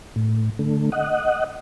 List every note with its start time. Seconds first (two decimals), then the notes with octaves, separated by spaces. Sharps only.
0.16 A2
0.59 D3 A3
0.92 D#5 F#5